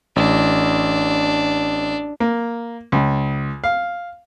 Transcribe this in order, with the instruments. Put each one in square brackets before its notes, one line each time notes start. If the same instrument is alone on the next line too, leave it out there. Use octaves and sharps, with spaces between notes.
[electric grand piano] A1 [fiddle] D4
[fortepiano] A#3
C#2
F5